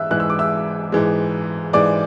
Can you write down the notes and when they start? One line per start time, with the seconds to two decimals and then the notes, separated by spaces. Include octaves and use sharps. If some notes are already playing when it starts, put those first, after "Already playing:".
Already playing: G#2 E3 E5 E6 F#6
0.11 G#2 E3 G#3 F#6
0.20 E6
0.30 D6
0.39 E5 E6
0.92 G#2 E3 G#3
1.73 G#2 E3 G#3 D5 D6